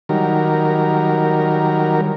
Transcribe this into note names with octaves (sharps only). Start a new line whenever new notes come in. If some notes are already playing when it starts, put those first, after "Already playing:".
D#3 F#3 G3 A#4